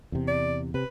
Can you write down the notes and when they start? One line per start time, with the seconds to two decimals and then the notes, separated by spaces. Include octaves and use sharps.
0.12 E2 C3
0.28 D5
0.74 C3 B4